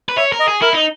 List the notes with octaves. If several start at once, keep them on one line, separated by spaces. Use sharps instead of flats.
B4
C#5 E5
A#4
D#5
G#4
E4 A#4
D#4